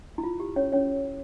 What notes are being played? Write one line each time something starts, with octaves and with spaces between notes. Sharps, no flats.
E4
F4
G4
C#4 C#5
C#4 C#5